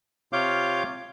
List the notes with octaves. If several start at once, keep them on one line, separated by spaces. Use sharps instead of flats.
C3 F4 C#5 F5 D6 G6